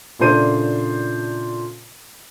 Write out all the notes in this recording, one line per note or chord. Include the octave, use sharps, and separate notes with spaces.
A#2 C#3 A3 D4 C5 D#7